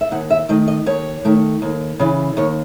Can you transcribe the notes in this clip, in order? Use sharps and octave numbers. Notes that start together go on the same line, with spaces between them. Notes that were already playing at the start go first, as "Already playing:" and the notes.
E5
D#2 F#5
E5
D#3 A3 D#5
D#5
D#2 C#5
D#3 A3
D#2
C#3 E3
D#2 C#5